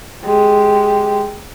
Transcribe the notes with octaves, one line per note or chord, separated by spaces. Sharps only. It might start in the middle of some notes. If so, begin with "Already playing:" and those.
G#3 G4